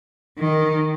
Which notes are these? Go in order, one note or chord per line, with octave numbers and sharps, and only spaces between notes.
D#3